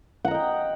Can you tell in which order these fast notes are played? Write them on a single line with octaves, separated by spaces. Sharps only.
F#5 A#5 D#5 G5